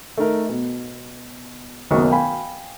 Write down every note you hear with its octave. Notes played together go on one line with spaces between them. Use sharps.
A3 D#4 A#4
B2
F#1 B1 D#3 F#3 C#6 D#6
F5 G5 G#5 B5